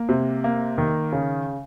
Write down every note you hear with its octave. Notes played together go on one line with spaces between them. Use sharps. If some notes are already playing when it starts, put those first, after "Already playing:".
Already playing: A#3
C3
A#3
D#3
C#3